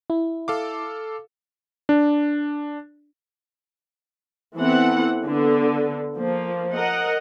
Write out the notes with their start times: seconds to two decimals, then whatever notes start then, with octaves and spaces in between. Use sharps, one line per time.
0.10 E4
0.48 A4 F5 D6
1.89 D4
4.57 E3 B3 C4 A4 F#5
5.25 D3 B3
6.17 F3 A#3
6.75 A#4 D#5 F#5